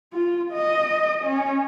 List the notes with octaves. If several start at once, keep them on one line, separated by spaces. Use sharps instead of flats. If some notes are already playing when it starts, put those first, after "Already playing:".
F4
D#5
C#4